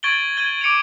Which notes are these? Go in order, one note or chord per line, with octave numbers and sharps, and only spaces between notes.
C#6 G#6 A6 D7 F#7 G7
G#6 D#7 G7
D6 C#7 D7 F7